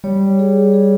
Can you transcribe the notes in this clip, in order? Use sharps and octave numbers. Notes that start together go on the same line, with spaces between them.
G3 C#5
G#4
G#4